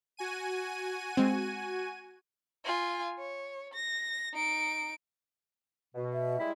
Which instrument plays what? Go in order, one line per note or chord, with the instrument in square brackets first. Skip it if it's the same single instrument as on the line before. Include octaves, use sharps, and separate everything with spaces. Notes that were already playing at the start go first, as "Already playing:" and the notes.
[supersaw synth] F#4 G#5 D#7
[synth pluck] G#3 C4
[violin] F4 G#5
C#5
A#6
D#4 D7
[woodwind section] B2
[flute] E5
[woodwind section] G3 G#3 E4